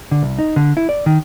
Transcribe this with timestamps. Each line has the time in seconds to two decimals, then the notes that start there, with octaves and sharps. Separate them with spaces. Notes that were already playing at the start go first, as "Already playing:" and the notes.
0.11 D3
0.23 C2
0.39 D#4
0.56 D3
0.77 E4
0.89 D5
1.06 D#3